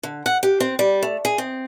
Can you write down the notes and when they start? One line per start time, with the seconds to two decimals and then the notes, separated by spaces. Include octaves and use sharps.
0.03 D3
0.26 F#5
0.43 G4
0.60 C4
0.79 G3
1.03 A3
1.25 G#4
1.38 C4